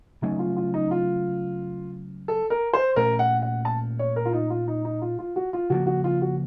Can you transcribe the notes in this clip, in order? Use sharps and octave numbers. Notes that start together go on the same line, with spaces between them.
C#3 F#3 A3 C#4 D#4
F4
F4
D#4
F4
A4
A#4
C5
A#2 A3 C#4 A#4
F#5
F#5
A5
C#5
A#4
F4
D#4
F4
D#4
D#4
F4
F4
F#4
F4
C#3 F3 A#3 F#4
F#4
F4
F#4